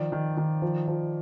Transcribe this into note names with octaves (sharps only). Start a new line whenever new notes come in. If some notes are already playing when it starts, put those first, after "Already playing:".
Already playing: D#3 F3 D5
D#3
D#3
F3
F3